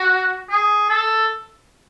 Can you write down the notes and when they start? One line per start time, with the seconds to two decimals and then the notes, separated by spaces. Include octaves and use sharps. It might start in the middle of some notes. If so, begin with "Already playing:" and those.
Already playing: F#4
0.50 G#4
0.90 A4